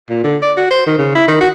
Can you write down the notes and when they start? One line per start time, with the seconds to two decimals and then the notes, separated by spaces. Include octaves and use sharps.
0.10 A#2
0.24 D3
0.43 D5
0.57 F#4
0.71 C5
0.87 D#3
0.99 C#3
1.16 E4
1.28 D#3
1.41 F#4